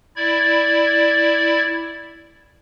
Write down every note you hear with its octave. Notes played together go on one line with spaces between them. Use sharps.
E4 D5 G#6